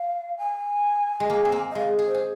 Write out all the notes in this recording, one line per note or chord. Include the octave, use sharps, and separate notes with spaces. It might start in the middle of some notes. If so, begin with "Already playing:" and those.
Already playing: F5
G#5
G#3
A#3
C4
A#3
D#5
G#3 F5
G#4
C5
G#4